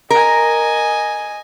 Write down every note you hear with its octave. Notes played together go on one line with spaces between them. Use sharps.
A#4 D#5 G#5